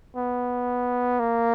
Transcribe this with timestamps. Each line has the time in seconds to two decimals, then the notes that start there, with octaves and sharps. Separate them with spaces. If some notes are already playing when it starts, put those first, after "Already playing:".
0.16 B3
1.20 A#3